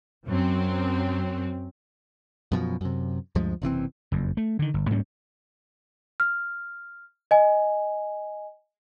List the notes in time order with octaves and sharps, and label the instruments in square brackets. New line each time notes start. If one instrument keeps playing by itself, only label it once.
[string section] F#2 F#3 C4
[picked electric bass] F#2 B2 F3
F#2 C3
D2 G2 F3 G#3
F#1 C3 E3 C4
[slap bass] F#1 F2
A3
D3 D#3
G1
G#2 G3 A#3 C#4
[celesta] F6
D#5 G#5